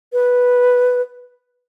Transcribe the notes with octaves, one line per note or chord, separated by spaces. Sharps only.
B4